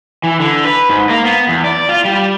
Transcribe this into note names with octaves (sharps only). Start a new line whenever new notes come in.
E3
D3
B4
G#2
A#3
B3
E2
D5
F4
G3